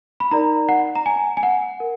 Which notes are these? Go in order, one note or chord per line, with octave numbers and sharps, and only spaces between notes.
B5
D#4 A#4 D5 A#5
F#5
A#5
G#5
G#5
F#5
A#4